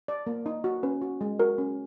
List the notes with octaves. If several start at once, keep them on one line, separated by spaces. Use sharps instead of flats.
D5
A#3
D#4
F#4
C#4 B4
F#4
G#3
F#4 A#4
C#4